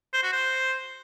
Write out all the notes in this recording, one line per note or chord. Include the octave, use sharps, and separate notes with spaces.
C5
F#4
C5